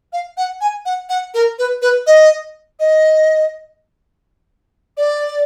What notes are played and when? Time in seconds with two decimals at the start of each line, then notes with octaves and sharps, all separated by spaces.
0.13 F5
0.37 F#5
0.61 G#5
0.85 F#5
1.09 F#5
1.34 A#4
1.59 B4
1.82 B4
2.07 D#5
2.79 D#5
4.97 D5